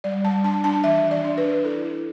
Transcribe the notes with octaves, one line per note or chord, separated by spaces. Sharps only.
G3 D5
G3 A5
D4 A5
D4 A5
E3 E5
E3
D5
D4
B4
D4
E4 A4
E4